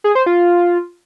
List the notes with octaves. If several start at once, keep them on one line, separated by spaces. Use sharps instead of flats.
G#4
C5
F4